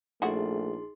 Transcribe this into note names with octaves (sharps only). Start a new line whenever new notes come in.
A#1 G#3 A3 D#4 E4 F#4 G#4 C6